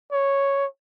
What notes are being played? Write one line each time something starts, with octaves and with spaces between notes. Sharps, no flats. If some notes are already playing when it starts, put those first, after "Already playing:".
C#5